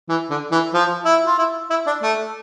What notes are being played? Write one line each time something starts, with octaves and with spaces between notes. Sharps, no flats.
E3
D3
E3
F3
E4
F4
E4
E4
D4
A3